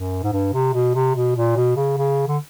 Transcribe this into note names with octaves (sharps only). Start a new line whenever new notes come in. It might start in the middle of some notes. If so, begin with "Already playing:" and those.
Already playing: F#2
G#2
G2
C3
B2
C3
B2
A#2
B2
C#3
C#3
D3